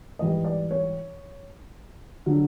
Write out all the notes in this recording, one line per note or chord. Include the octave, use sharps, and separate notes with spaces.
G#2 E3 G3 D#5
D5
C#5
D3 F#3